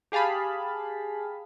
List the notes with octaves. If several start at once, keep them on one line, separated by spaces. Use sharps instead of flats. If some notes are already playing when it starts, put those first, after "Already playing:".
G4 G#4 F5 A5 B5